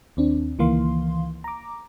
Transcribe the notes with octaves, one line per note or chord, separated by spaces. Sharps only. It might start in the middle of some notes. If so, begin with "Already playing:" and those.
D#2 C4 D4
C#2 D#3 E3 A#3 F5 C6
A#5 D6